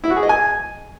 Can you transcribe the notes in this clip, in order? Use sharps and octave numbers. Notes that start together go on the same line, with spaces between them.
E4
F#4
G#4
D#5
G#5